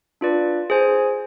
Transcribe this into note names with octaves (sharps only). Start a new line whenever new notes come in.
D4 F4 B4 D5
G#4 C5 G#5